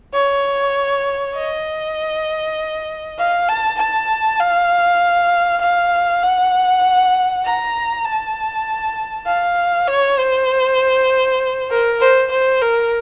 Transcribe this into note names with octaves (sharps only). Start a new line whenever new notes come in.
C#5
D#5
F5
A5
A5
F5
F5
F#5
A#5
A5
F5
C#5
C5
A#4
C5
C5
A#4